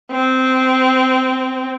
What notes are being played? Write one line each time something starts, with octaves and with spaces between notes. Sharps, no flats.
C4